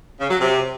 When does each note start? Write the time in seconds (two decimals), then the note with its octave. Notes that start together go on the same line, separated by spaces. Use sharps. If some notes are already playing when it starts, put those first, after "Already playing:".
0.20 C#3
0.30 F#3
0.41 C3